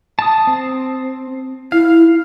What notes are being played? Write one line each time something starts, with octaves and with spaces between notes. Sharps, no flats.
A5 D#6
C4
E4 F5